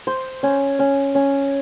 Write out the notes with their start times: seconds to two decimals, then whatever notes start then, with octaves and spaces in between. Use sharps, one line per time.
0.07 C5
0.43 C#4
0.79 C#4
1.15 C#4